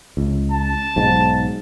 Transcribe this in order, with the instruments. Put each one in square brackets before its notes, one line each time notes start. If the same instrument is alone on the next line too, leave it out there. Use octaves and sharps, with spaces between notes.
[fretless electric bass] C#2
[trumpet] A5
[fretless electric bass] B1 G#2